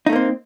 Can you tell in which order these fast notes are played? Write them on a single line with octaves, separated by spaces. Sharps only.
D#4 A3 A#3 C4